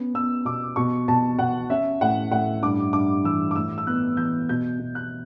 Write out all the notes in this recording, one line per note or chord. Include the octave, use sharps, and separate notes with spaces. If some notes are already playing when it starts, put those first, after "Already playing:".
Already playing: B3 C#4
B3 E6
B2 D6
B2 C#6
B2 A5
B2 F#5
C#4 E5
A2 F#5
A2 F#5
G2 D6
G2 D6
E3 E6
D6
A2 E6
E6
B3 F#6
E3 G6
B2 G6
B2
F#6